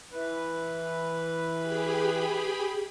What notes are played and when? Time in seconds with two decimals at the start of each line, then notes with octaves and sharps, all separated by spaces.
0.12 E3 B4
1.57 G4 G#4 B5